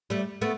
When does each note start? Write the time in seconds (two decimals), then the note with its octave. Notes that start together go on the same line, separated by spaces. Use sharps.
0.10 G3 A3
0.41 A3 B3